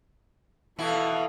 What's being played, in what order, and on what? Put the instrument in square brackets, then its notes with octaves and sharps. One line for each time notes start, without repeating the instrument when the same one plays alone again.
[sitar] B2 E3 E4 [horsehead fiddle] A4 F5